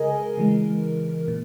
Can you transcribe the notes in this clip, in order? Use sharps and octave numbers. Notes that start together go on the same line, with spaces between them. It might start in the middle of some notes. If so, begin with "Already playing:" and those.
Already playing: C#3 G#3 G#4 A#4 D#5 G#5
C#3 E3 G#3
A#2